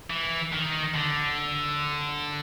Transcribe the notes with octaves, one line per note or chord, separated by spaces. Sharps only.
E3
D#3
D3